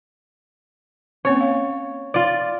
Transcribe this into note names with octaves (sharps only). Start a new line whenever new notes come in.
A#3 C4 C#4 C#5
F5
F4 D5